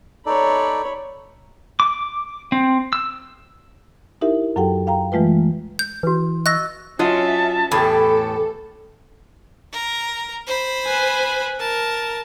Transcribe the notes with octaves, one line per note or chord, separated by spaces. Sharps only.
D#4 A4 C#5 D5 B5
D6
C4
E6
D#4 E4 G4 A#4 E5
F#2 F#3 G4 A4 F#5 G5
F5 G5 A#5
E3 G#3 A3 F4 B4
G6
E3 F#4 B4
D#5 C#6 E6 F#6 A#6
F#3 C#4 F4 D#5 E5 A5
E2 A2 G4 A4
A#4
C5 B5
B4 G#5
A#4 A5